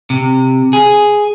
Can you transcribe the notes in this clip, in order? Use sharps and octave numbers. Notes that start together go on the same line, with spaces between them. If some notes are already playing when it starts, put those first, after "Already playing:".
C3
G#4